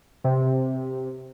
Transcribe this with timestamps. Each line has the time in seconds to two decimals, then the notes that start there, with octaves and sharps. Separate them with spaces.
0.24 C3